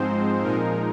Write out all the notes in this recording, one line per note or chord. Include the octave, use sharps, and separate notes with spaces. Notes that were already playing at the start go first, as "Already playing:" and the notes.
Already playing: G#2 F3 G#3 C4 D#4 C5
A#2 F3 G#3 D#4 A#4